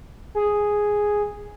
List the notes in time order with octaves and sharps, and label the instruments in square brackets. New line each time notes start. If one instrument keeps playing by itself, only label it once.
[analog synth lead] G#4